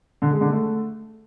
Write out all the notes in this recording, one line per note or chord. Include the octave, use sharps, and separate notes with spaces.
D3
G#3
D3
A3